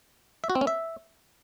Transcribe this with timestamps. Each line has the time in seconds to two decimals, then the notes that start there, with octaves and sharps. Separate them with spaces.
0.44 E5
0.50 F#4
0.55 C4
0.61 C#4
0.67 E5